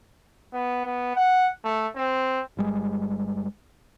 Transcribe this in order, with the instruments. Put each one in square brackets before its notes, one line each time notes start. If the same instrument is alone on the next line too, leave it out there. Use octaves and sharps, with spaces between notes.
[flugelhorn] B3
B3
F#5
A3
C4
[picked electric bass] G1 G3 G#3